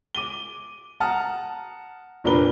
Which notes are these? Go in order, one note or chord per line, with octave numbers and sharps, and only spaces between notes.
D6 D#7 G7
F#5 A5 A#5 D#6 F6
F1 A#2 D4 A#4 B4 G7